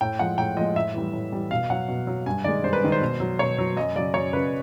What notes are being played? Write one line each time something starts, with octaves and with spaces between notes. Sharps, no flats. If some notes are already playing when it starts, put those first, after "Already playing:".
A2 G5
F3 G#3 F#5
A2 G5
F3 G#3 D#5
A2 E5
E3 G3
A2
E3 G3
B2 F5
F#3 F#5
B2
F#3
G2 G#5
D#3 G#3 D5
G2 C5
B4
D#3 G#3
C5
B2
F#3
B2 C#5
F#3
F#2 D#5
C#3 F#3 D5
F#2 C#5
C#3 F#3 B4